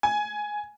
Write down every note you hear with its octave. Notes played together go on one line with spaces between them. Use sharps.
G#5